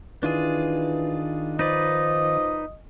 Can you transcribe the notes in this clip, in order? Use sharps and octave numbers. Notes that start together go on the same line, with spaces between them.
D#3 E3 D4 F4 G#4
F3 D#4 B4 D5 D#5